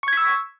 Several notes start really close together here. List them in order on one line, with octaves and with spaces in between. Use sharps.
C#6 G#6 B6 E6